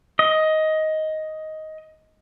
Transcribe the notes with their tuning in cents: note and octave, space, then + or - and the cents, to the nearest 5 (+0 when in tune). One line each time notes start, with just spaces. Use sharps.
D#5 +10